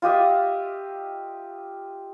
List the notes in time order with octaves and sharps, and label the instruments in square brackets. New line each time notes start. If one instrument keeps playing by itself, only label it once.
[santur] F4 G4 D#5 E5